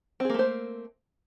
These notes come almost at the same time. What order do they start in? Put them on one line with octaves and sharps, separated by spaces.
C4 G#4 A#3 A3 C5